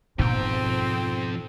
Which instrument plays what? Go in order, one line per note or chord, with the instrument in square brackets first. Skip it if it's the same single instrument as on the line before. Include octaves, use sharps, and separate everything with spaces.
[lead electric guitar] F2 G5 [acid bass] G#2 [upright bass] B2 [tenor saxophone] C4